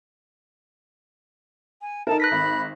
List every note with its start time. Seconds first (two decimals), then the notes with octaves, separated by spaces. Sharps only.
1.81 G#5
2.07 D#4 A4 A#4 A5
2.20 B4 F#6 A#6 B6
2.32 G#1 B5